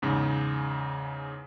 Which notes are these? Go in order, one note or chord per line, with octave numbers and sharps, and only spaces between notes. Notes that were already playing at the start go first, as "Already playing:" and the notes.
E2 G#2 C#3